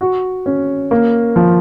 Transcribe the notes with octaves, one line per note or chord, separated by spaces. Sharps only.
F#4
C#4
A#3
F3